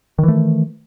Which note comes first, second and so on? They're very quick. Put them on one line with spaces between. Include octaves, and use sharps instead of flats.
D#3 E3 A3